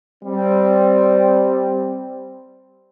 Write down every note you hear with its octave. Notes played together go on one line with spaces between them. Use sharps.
G3 C4